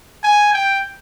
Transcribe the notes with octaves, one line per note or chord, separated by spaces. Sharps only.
G#5
G5